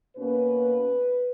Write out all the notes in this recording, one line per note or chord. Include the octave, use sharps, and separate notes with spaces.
B2 A#3 C#4 B4